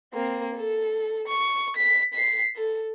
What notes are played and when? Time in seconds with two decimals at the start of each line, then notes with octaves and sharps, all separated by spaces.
0.14 A#3 C4
0.55 A4
1.28 C#6
1.76 B6
2.14 B6 C7
2.56 A4